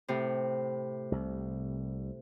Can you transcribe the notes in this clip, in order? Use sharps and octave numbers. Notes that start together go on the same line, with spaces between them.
A2 C3
C2